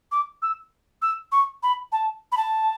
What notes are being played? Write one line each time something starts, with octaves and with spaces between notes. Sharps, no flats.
D6
E6
E6
C#6
B5
A5
B5
A5